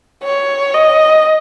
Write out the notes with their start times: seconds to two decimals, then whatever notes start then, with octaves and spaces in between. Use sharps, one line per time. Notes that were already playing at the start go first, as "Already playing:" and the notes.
0.24 C#5
0.75 D#5